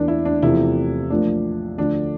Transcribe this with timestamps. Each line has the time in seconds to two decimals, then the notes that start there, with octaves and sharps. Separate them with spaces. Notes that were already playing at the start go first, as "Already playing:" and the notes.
Already playing: E2 E3 A#3 D4
0.08 E4
0.25 D4
0.43 E2 C3 F3 A3 E4
1.10 A1 A2 F3 A#3 D4
1.78 D2 D3 F3 A3 D4